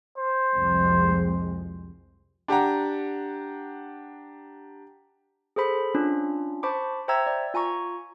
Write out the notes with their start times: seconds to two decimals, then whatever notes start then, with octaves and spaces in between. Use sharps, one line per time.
0.18 C5
0.56 C2 F2 G#3
2.48 D4 G4 F#5 A#5
5.56 G#4 A4 C5 B5
5.95 C#4 D4 F4
6.63 C5 A5 B5 C#6 D6
7.08 C5 E5 G5 A#5 E6 G#6
7.27 D5
7.54 F4 G#5 A#5 C#6